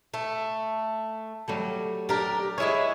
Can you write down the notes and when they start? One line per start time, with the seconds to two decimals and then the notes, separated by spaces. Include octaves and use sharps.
0.14 A3
1.48 F#3 G3 A3
2.09 D4 G4 A#4
2.58 G#3 E4 G#4 C#5